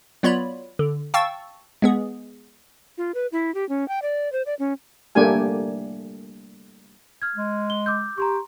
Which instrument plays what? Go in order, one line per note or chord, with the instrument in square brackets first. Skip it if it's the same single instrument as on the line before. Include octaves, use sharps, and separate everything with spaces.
[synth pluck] F#3 B3 F4 C#5 D5 B5
D3
F5 G5 A5 C#6 E6 A6
G#3 B3 G#4
[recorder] F4
B4
E4
G4
C#4
G5
D5
C5
D5
C#4
[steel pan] G3 A3 A#3 D4 G4 G#5
[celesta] F6 G#6
[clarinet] G#3
[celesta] G7
D6 E6 G6
[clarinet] G4 [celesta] A#5 C6 C#6